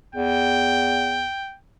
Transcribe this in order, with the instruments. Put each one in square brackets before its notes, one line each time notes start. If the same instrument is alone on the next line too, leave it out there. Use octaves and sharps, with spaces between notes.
[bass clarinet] E2 [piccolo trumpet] G5